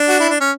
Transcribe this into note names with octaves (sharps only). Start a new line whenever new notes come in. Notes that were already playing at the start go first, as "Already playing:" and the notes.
Already playing: D4
F#4
E4
D4
C#4